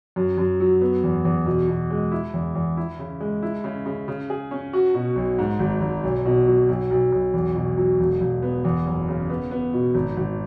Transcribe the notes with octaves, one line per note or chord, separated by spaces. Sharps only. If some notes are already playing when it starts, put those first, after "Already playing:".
F#2
F#2
F#3
B3
E2
E2
B2
B2
G#3
E4
E2
E2
E4
C#3
G#3
E4
C#3
C#3
C#3
G#4
C#4
F#4
B2
B1
G#2
G#1
G#1
B1
B2
F#3
B1
B1
B1
E2
B2
F#3
E1
E1
B3
E2
F#1
C#3
B3
B3
B2
G#1
G#1